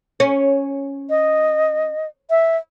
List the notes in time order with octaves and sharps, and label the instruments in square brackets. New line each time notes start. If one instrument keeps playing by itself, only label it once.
[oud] C#4
[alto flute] D#5
E5